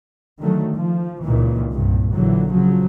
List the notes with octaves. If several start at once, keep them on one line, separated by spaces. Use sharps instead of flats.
D3 D#3 F#3 A3
F3
C#2 A#2 D#3 E3
C2 G2 A#2
A#1 D3 E3 F#3
C#3 F3 F#3